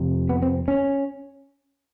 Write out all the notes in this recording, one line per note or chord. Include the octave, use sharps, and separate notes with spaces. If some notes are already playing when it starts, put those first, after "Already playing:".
Already playing: F2 C3
B3
C4
C#4